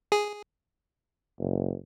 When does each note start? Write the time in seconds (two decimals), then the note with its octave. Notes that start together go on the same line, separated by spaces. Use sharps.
0.12 G#4
1.39 F#1